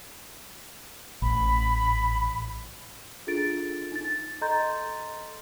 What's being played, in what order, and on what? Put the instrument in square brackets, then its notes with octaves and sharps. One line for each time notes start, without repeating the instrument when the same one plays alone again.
[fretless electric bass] A1 [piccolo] B5
[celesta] D4 F4 G#4 A4 A6 D7
D#4 A6
A4 D#5 A#5 C6 G6 A6